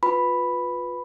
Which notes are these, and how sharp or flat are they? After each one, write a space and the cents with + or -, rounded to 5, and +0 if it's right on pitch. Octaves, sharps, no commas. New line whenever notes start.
F4 +30 B4 +0 B5 +0